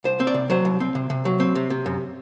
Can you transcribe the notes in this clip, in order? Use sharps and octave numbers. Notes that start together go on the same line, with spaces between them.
C2 C5
C4
D5
C3
F#3 C5
C2
C4
C3
C3
F#3
C4
C3
C3
F#2